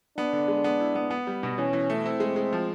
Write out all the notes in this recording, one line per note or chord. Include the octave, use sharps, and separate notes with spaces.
B3 D4
D3
G#3
B3
E4
B3
B3
G3
B2
E3 C#4
E3
A3
C4 E4
G#3
G#3
F3